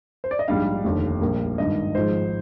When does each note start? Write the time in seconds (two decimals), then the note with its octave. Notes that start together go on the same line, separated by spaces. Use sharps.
0.24 C5
0.31 D5
0.39 D#5
0.48 A#1 G#2 G3 D4 F5
0.85 F1 D#2 D3
1.21 A#1 A#2 G3 A#3
1.58 G#1 G2 D#3 D#5
1.94 G#1 G#2 F3 G#3 C5